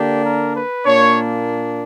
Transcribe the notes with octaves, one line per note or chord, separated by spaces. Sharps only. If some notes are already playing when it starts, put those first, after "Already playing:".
Already playing: D3 A#3 D4 G4
A#4
B4
A#2 A#3 D4 C#5